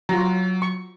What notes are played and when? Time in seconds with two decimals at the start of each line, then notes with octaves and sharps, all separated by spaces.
0.09 F#3 F4 F#4 A#5
0.62 C#6